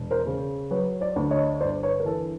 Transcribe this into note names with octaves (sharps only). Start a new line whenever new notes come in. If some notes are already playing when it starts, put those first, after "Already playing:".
Already playing: E1
A#4 C5
C#3
F#3 B4 C#5
C5 D5
D2
C#5 D#5
G1 C5 D5
B4 C#5
A#4
E3 A4 B4